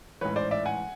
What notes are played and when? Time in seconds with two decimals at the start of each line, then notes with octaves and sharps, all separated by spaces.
0.21 A1 G#2 E3 B4 C#5
0.36 C5 D5
0.51 D5 E5
0.65 F#5 G#5